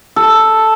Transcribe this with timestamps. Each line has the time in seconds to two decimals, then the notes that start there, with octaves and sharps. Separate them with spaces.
0.16 A4